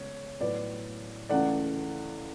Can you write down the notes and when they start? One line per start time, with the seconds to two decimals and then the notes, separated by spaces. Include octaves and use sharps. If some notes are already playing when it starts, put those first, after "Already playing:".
Already playing: C#2 C#3 G#3 B3 C#5
0.41 A2 F#3 B3 B4 D5
1.29 C#2 C#3 E3 A3 D5 F#5